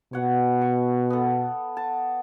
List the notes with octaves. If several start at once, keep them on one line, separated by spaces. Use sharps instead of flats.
B2 C#5 F#5
C#6
B3 A4
A5